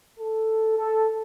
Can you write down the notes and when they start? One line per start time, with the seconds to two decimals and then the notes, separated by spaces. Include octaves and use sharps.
0.18 A4
0.76 A4